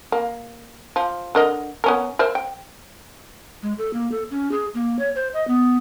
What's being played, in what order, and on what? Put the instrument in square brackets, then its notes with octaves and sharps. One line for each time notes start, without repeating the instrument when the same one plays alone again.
[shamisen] A#3
F3
D3 A#4 D#5
B3 C#4 A#4
A#4 C5 E5
G5
[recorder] G#3
A4
A#3
A4
C#4
G#4
A#3
C#5
C5
D#5
B3